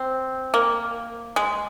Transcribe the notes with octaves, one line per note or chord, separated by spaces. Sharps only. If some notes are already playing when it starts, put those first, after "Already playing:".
Already playing: C4
A#3
G#3